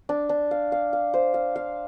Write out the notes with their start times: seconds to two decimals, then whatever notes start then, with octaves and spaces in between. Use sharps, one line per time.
0.09 D4
0.29 D4
0.51 F5
0.72 F5
0.93 F5
1.14 C5
1.34 F5
1.56 F5